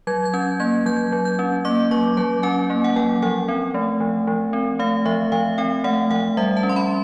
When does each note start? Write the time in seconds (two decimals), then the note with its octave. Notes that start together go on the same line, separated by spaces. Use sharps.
0.07 F#3 G#6
0.25 G#6
0.33 C#4 G6
0.60 A#3 G#6
0.86 F#3 G6
1.12 F#3
1.25 G6
1.39 C#4
1.65 A#3 D6
1.91 F#3 C#6
2.17 F#3 A5
2.43 C#4 G#5
2.70 A#3
2.84 F#5
2.96 F#3 G5
3.22 F3 F#5
3.48 C4
3.74 A3
4.01 F3
4.27 F3
4.53 C4
4.79 A3 F5
5.05 F3 E5
5.32 F3 F5
5.58 C4 G5
5.84 A3 F#5
6.10 F3 F#5
6.37 G3 E5
6.57 A5
6.63 C#4
6.69 C6
6.76 B5